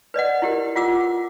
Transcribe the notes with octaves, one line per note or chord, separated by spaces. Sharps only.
B4 D5 D#5 F#5
E4 G4 A#4
F4 F#5 D6 E6